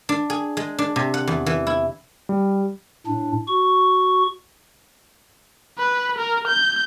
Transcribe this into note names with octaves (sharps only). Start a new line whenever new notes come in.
D4
G#4
G#3
D4
C3
F#5
E2
E3
E4
G3
A2 D4
F#4 C#6
B4
A#4
G6